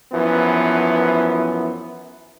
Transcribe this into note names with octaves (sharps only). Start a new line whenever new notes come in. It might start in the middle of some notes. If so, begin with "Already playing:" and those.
F#2 E3 F3 B3